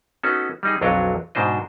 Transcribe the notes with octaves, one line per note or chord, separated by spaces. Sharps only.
B3 C#4 D#4 F#4 A4
G3 D#4 G#4
B1 F2 F#3 D4 C#5 D#5
G#2 B2 D4 C5 D#5